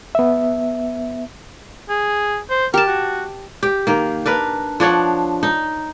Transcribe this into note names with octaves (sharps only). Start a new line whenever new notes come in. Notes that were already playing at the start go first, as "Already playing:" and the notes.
B3 E5
G#4
C5
G4 A#4 A5
F#4
G4
D#3 A#3
D4 A#4 B4
F3 D4 C#5 F#5
D#4